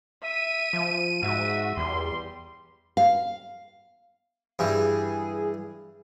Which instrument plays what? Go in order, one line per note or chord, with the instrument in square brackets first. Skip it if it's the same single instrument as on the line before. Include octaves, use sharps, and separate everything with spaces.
[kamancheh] E5 [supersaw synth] D#7
[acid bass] F3
[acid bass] G#2 [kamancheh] F#4 [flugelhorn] E5
[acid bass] E2 [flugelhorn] G3 [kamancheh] C6
[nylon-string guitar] F5
[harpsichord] G2 E3 [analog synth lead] G#4